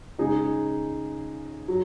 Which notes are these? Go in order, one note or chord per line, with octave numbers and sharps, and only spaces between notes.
C#3 G#3 D#4 G#4
F#3